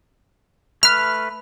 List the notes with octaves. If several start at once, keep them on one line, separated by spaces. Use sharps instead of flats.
A3 B4 F6